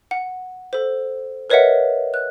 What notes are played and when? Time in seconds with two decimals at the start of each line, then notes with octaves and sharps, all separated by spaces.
0.11 F#5
0.73 A4 C5
1.50 A#4 B4 C#5 D#5 E5 F#5
2.14 F#6